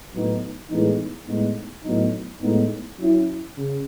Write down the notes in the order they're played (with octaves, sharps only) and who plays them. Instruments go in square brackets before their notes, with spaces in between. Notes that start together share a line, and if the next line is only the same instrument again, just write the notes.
[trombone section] A2 F#3 B3 D#4
A2 E3 G#3 B3 D#4
A2 G#3 B3 D#4
A2 F#3 B3 D#4
A2 G#3 B3 D#4
F#3 C#4 E4
C#3